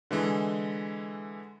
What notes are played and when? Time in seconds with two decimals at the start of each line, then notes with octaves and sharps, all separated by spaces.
0.11 D3 E3 G#3